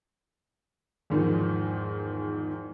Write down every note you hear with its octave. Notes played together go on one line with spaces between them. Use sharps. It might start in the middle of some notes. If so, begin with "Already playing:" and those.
E2 G#2 D#3 F3